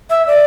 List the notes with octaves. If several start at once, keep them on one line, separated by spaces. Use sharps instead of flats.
E5
D5